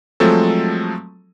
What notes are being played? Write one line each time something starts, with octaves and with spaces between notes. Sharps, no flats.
F3 F#3 G#3 A3 C4 A4